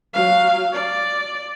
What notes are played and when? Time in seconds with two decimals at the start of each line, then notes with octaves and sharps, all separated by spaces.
0.14 F#3 F5
0.73 D5